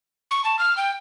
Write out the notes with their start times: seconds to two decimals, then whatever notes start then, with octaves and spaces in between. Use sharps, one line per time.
0.31 C#6
0.44 A5
0.59 F6
0.77 G5